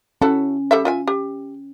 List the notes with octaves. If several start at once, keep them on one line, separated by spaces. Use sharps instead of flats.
C#4 E4 F#4 A4
G3 A4 E5
F4 E5 G#5
G4